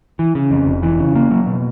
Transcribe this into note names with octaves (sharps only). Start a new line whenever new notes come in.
E3
C#3
F2
F1
E3
C#3
A#3
F#3
B2